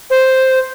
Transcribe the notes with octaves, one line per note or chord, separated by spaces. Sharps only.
C5